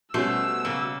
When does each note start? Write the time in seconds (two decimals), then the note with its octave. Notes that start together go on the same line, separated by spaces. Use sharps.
0.14 B2 G3 A3 C#4 C5 E6
0.65 C#3 A#3